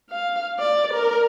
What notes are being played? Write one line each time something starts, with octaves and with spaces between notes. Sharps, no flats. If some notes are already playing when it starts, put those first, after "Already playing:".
F5
D5
A#4